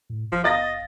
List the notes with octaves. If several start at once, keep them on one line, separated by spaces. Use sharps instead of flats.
A2
F#1 F3
D#5 F5 A6 A#6